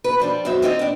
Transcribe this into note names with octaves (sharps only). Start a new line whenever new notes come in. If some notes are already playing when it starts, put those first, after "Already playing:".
B4
F3 G3 D4
F#2 G#3 B3 F#4 C5 E5
G3 C4 D#4 F4 C#5 D#5
B3 D4